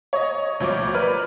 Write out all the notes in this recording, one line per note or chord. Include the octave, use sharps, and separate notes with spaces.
C#5 D#5
D2 F3 C#5 D6
A#4 B4 D5 F6